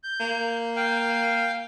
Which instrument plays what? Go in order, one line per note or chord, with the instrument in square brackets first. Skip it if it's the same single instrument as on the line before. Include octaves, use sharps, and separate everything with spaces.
[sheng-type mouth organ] G6
[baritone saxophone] A#3
[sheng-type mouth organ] F5 G5